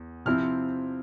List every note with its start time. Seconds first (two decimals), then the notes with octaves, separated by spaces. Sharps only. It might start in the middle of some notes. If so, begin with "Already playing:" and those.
Already playing: E2
0.25 C3 F3 C4 E4 F6